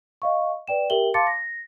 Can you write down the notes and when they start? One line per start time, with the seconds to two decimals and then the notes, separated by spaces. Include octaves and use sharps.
0.22 D#5 F5 C#6
0.68 B4 D5 G5 E7
0.90 G4 A#4 E5 G5 F#7 G7
1.14 F5 A5 C6 D6 A6 C#7
1.27 A#6